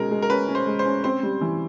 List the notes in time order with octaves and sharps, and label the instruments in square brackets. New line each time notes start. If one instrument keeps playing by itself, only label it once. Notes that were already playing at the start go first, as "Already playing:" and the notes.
Already playing: [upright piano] B2 G#3 C#4 [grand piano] A#4
[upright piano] G#3
[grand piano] A#4
[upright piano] C#4 [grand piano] B4
[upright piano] C#4
[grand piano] C5
[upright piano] G#3
[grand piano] C5
[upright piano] C#4
[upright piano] C4 [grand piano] C5
[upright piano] G3
E3